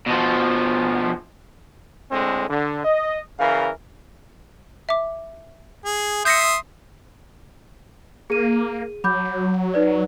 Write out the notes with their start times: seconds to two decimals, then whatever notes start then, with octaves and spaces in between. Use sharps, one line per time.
0.06 B2 F3
2.11 A2 D3 G#3 C4
2.48 D3
2.84 D#5
3.40 C#3 E3 A#4 F5
4.89 E5 D6
5.85 G#4
6.25 E5 C6 D#6 G6 A#6 C#7
8.30 A#3 G#4 D#7
9.04 F#3 B5 D6 G6
9.74 D#4 B4 D5